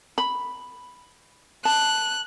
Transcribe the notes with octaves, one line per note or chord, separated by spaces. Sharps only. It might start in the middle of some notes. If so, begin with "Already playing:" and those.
B5
A5 F#6